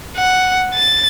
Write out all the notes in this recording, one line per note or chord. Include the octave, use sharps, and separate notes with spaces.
F#5
A6